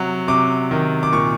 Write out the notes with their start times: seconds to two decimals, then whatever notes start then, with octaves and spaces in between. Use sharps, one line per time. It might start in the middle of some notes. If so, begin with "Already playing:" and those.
Already playing: C3 F#3
0.28 C3 D6
0.71 D#3
1.03 D6
1.12 A#2 C#6